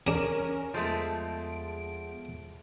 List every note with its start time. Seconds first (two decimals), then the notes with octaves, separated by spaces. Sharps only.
0.07 C#4 D4 G#4 A#4
0.74 E2 F3 G#3 A3 D7